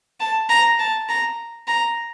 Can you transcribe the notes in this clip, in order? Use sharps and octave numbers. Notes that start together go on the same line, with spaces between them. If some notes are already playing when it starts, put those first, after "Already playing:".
A5
A#5
A5
A#5
A#5